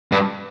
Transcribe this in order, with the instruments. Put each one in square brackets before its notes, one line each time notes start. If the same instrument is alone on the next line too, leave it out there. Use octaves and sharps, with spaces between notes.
[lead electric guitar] G2